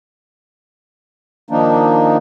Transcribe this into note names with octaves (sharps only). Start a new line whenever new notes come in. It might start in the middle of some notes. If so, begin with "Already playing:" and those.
D#3 F3 A#3 D4 D#4